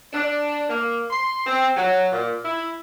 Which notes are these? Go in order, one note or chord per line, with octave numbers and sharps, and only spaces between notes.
D4
A#3
C6
C4
F#3
A#2
E4